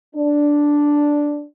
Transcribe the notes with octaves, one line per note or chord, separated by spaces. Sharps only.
D4